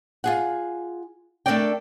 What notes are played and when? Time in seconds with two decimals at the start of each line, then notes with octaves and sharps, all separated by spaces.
0.24 F4 G#4 F#5
1.46 A3 D4 A4 A#4 D5 G5